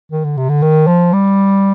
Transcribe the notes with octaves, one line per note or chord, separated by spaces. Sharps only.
D#3
D3
C3
D3
D#3
F3
G3